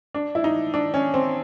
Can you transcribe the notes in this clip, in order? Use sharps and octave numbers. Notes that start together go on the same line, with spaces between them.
D4
E4
D#4
D4
C#4
C4